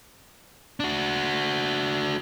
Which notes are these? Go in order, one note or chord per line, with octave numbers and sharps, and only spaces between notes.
D4 F#4